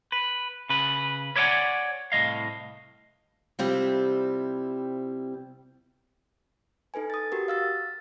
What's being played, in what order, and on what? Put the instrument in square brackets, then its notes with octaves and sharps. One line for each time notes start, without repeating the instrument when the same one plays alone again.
[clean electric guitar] B4
C#3 B4
B4 C#5 D5 E5 F#5 G#5
C2 A2 F3 D#5 F5
[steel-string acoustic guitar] C3 G3 C4 E4 F4
[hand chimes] D#4 A4 B4 G#5
D#6 A6
F#4 G4 A#4
F5 E6 A6